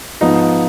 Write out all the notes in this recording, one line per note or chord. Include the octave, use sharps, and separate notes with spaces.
G#2 F3 B3 D#4